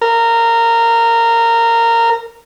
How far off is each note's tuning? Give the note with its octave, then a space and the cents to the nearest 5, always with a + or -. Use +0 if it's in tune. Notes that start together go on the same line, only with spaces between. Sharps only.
A#4 -15